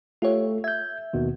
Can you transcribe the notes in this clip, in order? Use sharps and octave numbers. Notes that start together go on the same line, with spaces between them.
A3 F4 G4 A4 C#5
E5 G6 G#6
D#2 B2 D#3